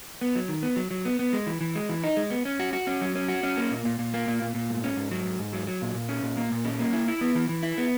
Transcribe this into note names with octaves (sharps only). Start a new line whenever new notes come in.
B3
F#3
D#3
B3
F#3
F#3
B3
B3
G#3
E3
E3
G#3
E3
D#4
G#3
B3
C#4
F#4
F#4
C#4
F#3
C#4
F#4
C#4
A#3
A#2
A#2
A#2
A#3
A#2
A#2
A#2
G#2
C#4
G#2
F#3
G#2
G#2
F#3
F#3
A#2
A#2
C#4
A#2
A#3
A#2
C#4
A#3
E4
E4
B3
E3
E3
E4
B3